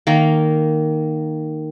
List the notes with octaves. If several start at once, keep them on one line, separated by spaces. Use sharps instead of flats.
D#3 A#3